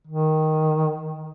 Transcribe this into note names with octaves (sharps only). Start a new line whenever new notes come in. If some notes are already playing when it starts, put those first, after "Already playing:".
D#3